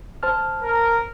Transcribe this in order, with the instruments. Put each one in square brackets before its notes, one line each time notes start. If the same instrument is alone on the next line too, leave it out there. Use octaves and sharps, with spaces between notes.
[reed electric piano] C5 A5 F6
[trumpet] A#4